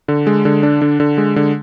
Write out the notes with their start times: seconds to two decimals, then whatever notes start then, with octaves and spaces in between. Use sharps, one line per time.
0.08 D3
0.27 G#3
0.45 D3
0.63 D4
0.82 D3
1.00 D3
1.18 G#3
1.36 D3